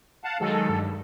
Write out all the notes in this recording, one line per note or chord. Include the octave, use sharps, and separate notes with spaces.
F5 F#5 A5
D#3 F#3 G#3 A4
G2